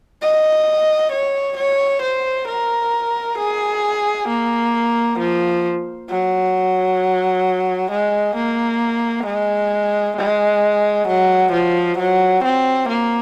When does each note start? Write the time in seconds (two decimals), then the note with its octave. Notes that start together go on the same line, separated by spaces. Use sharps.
0.22 D#5
1.12 C#5
1.57 C#5
2.02 C5
2.48 A#4
3.38 G#4
4.28 A#3
5.19 F3
6.10 F#3
7.91 G#3
8.36 A#3
9.26 G#3
10.17 G#3
11.08 F#3
11.52 F3
11.98 F#3
12.44 C4
12.89 A#3